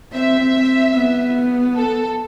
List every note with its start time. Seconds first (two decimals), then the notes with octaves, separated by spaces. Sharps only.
0.13 C4 E5
0.53 C4
0.94 B3
1.75 A4